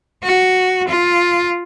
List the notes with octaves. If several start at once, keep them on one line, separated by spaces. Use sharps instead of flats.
F#4
F4